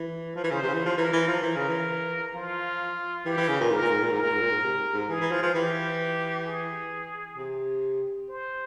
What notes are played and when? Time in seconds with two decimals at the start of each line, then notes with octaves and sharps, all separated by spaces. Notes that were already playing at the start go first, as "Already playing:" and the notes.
Already playing: E3
0.36 F3
0.44 E3
0.51 C#3 C5
0.62 C3
0.69 C#3
0.74 E3
0.86 F3
0.98 E3 A#4
1.13 E3
1.28 F3
1.42 E3 A#4
1.56 C#3
1.69 E3
2.34 F3 F4
3.26 E3 G4
3.37 E3
3.49 C#3
3.61 A#2
3.71 G#2 A#4
3.81 A#2
3.91 G#2
4.02 A#2
4.11 G#2
4.17 A#4
4.22 A#2
4.32 G#2
4.42 A#2
4.51 G#2
4.64 C3
4.94 G#2
5.09 E3 G#4
5.21 E3
5.32 F3
5.43 F3
5.54 E3 G4
6.46 G#4
7.37 C3
8.29 C5